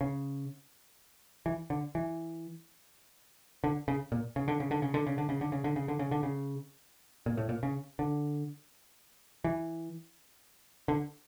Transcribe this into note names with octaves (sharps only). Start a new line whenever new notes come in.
C#3
E3
D3
E3
D3
C#3
A#2
C#3
D3
C#3
D3
C#3
D3
C#3
D3
C#3
D3
C#3
D3
C#3
D3
C#3
D3
C#3
A#2
A2
A#2
C#3
D3
E3
D3